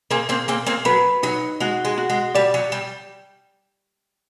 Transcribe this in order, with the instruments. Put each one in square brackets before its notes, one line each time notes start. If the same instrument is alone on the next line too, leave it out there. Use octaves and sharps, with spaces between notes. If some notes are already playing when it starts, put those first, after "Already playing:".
[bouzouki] A#3 C4 [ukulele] G#4
[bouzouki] A#3 C4
[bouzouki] A#3 C4 [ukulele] G#4
[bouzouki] A#3 C4
[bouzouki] F#3 [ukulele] B4
[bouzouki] F#3 [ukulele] D#4
[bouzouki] G#3 [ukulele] F#4
[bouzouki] G#3
[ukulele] F#4
[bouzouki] G#3
[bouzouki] G3 [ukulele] D5
[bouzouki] F#3
G3